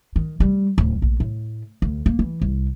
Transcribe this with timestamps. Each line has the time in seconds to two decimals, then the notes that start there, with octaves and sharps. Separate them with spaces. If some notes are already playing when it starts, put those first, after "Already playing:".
0.16 D#3
0.40 G3
0.78 D1
1.02 A#1
1.20 A2
1.82 D2
2.06 A#3
2.19 E3
2.42 C2